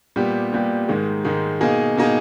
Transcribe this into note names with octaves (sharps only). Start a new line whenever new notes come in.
A#2 G3 B3 G4
A#2 G3 B3 G4
G#2 D#3 G#3
G#2 D#3 G#3
B2 A#3 D#4 G#4
B2 A#3 D#4 G#4